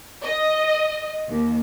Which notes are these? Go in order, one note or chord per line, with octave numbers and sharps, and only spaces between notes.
D#5
D#2